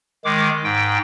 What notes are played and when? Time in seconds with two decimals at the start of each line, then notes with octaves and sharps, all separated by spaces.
0.25 D#3 G#3 D6
0.64 G#2 G5